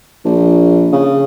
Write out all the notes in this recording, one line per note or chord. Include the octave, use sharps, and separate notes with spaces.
A#1
C#3